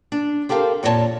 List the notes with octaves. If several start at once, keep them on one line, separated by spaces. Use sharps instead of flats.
D4
C4 G4 A4 A#4 F5
F2 A#2 C4 F#4 C#5 A5